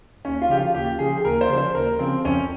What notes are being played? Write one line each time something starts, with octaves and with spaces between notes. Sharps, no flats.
D#2 C#4
F4
C#3 F3 G4
F4
D#2 G4
C#3 F3 G#4
G#4
D#2 A#4
C5
C#3 F3
C5
D#2 A#4
C#3 F3 C4
F2 C#4